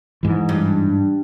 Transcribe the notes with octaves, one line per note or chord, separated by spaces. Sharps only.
G#2 E3
G2